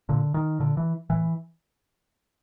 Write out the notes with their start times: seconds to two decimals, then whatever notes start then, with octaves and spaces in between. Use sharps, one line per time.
0.09 A#2 D3
0.34 D#3
0.60 A#2 D3
0.77 E3
1.10 A2 E3